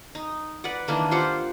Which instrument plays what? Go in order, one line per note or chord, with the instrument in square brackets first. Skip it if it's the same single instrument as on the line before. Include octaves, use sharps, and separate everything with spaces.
[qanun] D#4
B4 D5 F#5
D#3 E3 A#3 D4
F4 G4 C5 F#5